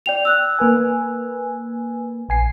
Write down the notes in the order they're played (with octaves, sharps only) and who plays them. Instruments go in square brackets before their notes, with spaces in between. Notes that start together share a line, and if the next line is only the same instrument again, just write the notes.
[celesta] D5 G5 F7
E6 F#6
[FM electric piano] A#3 B4 G#5
A#1 G#5 C7